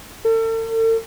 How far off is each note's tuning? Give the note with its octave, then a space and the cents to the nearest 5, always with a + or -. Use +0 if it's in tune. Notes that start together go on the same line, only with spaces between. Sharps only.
A4 +40